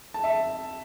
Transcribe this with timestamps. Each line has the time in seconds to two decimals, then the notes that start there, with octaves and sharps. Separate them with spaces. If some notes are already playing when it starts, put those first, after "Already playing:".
0.14 A5
0.24 E5